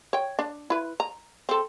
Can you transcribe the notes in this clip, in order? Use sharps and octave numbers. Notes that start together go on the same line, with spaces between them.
C#5 G5
D4
E4 B4
A#5
C4 A4